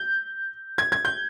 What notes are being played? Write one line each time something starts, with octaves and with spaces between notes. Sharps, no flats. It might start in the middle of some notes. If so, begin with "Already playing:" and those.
Already playing: G6
G#6
G#6
G6